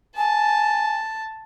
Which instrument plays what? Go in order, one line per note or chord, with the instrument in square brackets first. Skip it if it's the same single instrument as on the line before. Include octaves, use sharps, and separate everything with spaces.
[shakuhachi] G#5 [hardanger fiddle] A5